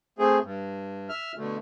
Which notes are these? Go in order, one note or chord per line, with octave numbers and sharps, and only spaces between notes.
A3 C4 G#4
G2
E5 F6
B2 D3 A3